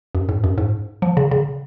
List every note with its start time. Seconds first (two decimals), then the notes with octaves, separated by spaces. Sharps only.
0.15 F#2
0.29 G#2
0.44 F#2
0.58 G#2
1.02 F3
1.17 C#3
1.31 C#3